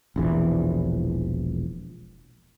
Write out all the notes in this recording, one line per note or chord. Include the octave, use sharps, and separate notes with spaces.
E1 A#1 E3